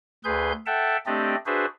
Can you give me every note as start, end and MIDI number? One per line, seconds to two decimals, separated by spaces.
0.24 0.52 38
0.24 0.52 68
0.24 0.52 71
0.24 0.52 84
0.24 0.52 91
0.66 0.97 69
0.66 0.97 76
0.66 0.97 78
0.66 0.97 79
0.66 0.97 81
1.06 1.35 57
1.06 1.35 60
1.06 1.35 62
1.06 1.35 67
1.06 1.35 74
1.06 1.35 75
1.46 1.66 62
1.46 1.66 66
1.46 1.66 68
1.46 1.66 71
1.46 1.66 72
1.46 1.66 76